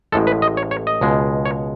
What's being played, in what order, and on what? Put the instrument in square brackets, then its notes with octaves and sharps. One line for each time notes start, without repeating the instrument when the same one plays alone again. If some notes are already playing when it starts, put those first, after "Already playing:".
[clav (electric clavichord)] A1 A2 G#3 A4
B4
D#5
C#5
C#5
D#5
C#2 B2 G#3
C#5